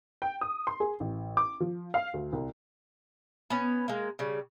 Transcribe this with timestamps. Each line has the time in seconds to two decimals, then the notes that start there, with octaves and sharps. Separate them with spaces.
0.22 G5
0.41 D#6
0.67 C6
0.80 G#4
1.00 A1
1.37 D6
1.60 F3
1.94 F5
2.14 D2
2.33 C2
3.50 B3 C#4
3.88 G#3 A#3
4.19 C#3 G3